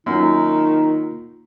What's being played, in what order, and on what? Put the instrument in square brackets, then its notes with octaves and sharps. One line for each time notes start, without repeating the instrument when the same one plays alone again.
[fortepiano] F#2 [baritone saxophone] D#3 [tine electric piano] A#3 F4 [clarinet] D#4